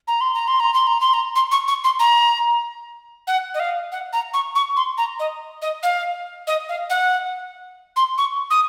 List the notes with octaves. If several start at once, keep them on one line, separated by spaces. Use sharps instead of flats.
A#5
C6
A#5
C6
A#5
C6
A#5
C6
A#5
C6
C#6
C#6
C6
A#5
F#5
D#5
F5
F#5
A#5
C#6
C#6
C6
A#5
D#5
D#5
F5
D#5
F5
F#5
C6
C#6
D#6